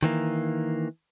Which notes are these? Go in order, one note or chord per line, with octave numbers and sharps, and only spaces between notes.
D#3 E3 A#3